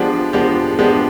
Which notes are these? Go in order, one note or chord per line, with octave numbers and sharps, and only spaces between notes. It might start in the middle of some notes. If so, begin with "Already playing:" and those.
Already playing: F3 G#3 B3 D4 G4
F3 G#3 B3 D4 G4
F3 G#3 B3 D4 G4